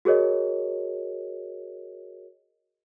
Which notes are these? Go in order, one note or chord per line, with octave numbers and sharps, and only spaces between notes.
F#4 G#4 A#4 C#5 D#5